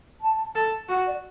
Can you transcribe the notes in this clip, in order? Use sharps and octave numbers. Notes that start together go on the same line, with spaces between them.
A5
A4
F#4 F#5
D5